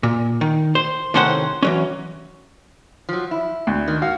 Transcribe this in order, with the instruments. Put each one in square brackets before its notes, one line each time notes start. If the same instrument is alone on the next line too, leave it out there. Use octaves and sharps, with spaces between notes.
[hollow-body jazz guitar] A#2
D#3
C5
A2 C3 D#3 C#4 C5 F#5
E3 F#3 C#4
[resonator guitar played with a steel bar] F3 F#3
E4
[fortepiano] D2
[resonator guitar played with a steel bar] D#3
[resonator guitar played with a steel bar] F#4 [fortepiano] F5